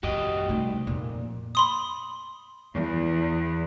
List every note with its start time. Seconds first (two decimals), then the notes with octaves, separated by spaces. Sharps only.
0.03 A#1 F#2 F#4 G4 D#5
0.49 C2 A3 D#4
0.87 F2 A#2
1.55 B5 C6 D#6
2.74 E2